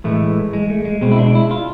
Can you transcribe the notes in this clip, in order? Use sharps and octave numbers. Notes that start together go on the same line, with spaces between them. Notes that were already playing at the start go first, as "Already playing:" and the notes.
A2 E3 G#3 A3
G#3
A3
G#3
B2 G#3 C4
E4
D4
E4
F4